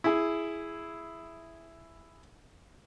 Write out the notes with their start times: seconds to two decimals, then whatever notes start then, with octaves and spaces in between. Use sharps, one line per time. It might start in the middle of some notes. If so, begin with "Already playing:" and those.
0.04 E4 G#4